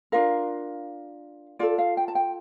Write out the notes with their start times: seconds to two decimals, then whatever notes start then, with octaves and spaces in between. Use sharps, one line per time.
0.12 D4 F4 A#4 F5
1.59 F4 A4 D5
1.78 F5
1.97 G5
2.08 A5
2.15 G5